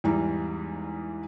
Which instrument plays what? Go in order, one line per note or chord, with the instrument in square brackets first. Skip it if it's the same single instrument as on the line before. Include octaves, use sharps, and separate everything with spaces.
[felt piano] E2 G#2 E3 G3 A#5